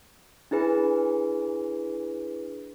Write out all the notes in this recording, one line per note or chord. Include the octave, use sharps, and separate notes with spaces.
D4 E4 G#4 B4